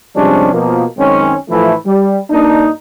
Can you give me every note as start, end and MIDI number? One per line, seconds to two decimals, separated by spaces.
0.16 0.49 48
0.16 0.49 53
0.16 0.49 55
0.16 0.49 56
0.16 0.49 61
0.16 0.49 62
0.52 0.84 47
0.52 0.84 53
0.52 0.84 58
0.97 1.34 42
0.97 1.34 51
0.97 1.34 56
0.97 1.34 60
0.97 1.34 61
1.50 1.73 45
1.50 1.73 52
1.50 1.73 53
1.50 1.73 57
1.50 1.73 64
1.86 2.19 55
2.30 2.68 43
2.30 2.68 58
2.30 2.68 62
2.30 2.68 63